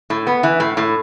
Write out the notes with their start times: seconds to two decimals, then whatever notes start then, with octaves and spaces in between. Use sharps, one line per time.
0.10 A2
0.27 B3
0.43 E3
0.60 A2
0.77 A2